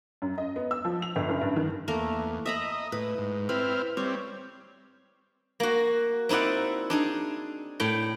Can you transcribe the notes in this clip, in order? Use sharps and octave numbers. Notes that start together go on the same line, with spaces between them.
F#2
D#5
B3
E6
F3
F7
G1
F#1
G2
D#3
E2 A3 A#3 A#4
D#5 E5 A#5 B5
A2 B4
G#2
C4 E4 B4 F6
G3 C4 C#5
A#3 F#4
C4 D#4 E4 D5 F#5
D4 D#4 G#4
A2 G5